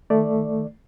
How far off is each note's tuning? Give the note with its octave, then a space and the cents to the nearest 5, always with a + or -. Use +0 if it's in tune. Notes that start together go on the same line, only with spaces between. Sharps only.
D#3 +0 A3 +0 D5 +0